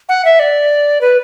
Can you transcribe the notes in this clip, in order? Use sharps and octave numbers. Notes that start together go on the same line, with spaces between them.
F#5
E5
D5
B4